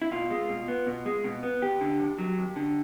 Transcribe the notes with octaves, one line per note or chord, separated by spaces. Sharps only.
E4
B2 F4
G#3
B2
B3
B2
G#3
B2
B3
D#2 G4
D3
D#2
F#3
D#2
D3